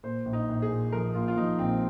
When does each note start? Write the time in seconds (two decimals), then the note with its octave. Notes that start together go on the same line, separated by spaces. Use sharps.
0.03 A#2 C5
0.25 A#1
0.33 D#4
0.49 A#1
0.62 G#4
0.70 A#2
0.92 F3 A#4
1.14 A#2 F4
1.28 F4
1.37 F3 D#4
1.59 A#1 C4